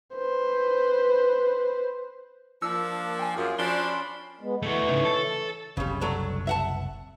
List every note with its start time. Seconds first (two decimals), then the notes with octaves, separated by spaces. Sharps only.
0.16 B4 C5
2.62 F3 A#3 D4 E6
3.19 G5 G#5
3.37 F#2 F4 G#4
3.59 F3 C#4 D4 B5 C6 G7
4.41 G#3 B3
4.63 E3 A3 F#4 C#5
4.89 C#3 D#4
5.05 A4
5.77 F#1 C2 C#3 G3
6.01 F#3 A3 D4
6.47 E5 F#5 A5